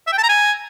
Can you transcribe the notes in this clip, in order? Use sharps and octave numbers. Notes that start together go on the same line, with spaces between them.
E5
G5
A5
A#5
G#5